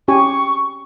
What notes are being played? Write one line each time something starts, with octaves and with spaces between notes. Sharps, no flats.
C#4 G4 G#5 C#6